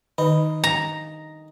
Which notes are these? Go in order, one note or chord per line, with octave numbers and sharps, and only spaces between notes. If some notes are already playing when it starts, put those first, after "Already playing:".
D#3 D#4
A#5